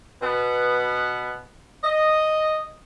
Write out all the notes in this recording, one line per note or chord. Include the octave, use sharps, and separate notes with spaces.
B2 B3
D#5